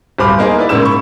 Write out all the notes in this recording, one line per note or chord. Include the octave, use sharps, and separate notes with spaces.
D1 G2 C5 B5 D6 F6
A#3 B3 D#4 G#4 A#4 C5
E4 B4 D5
G#2 C#3 A#3 C#4 E6 E7
B5 C#6